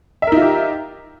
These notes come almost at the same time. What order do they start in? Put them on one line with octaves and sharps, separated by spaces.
E5 A#4 D#4 F4 G4